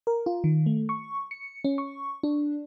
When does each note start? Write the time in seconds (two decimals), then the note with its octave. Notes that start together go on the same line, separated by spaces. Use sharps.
0.07 A#4
0.26 F4
0.44 D#3
0.66 A3
0.89 C#6
1.31 C#7
1.64 C#4
1.78 C#6
2.23 D4